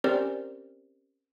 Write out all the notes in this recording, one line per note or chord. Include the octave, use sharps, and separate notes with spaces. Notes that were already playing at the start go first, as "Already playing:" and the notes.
C4 C#4 G4 A#4 C5 D5